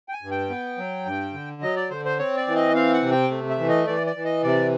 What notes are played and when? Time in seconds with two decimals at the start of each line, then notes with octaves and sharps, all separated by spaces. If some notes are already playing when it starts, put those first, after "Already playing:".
0.09 G5
0.13 G#5
0.22 G2
0.31 G5
0.50 B3
0.78 F#3
1.05 G2
1.34 D3
1.62 F#3 D#5
1.76 D5
1.90 D3 C5
2.05 C5
2.18 C4 C#5
2.37 D5
2.47 E3
2.56 D#5
2.75 C4 F5
2.94 F#5
3.03 C3
3.12 G5
3.31 A3
3.50 E5
3.59 E3
3.69 D#5
3.87 E3 D5
4.07 D5
4.16 E3
4.25 D#5
4.43 C3 D5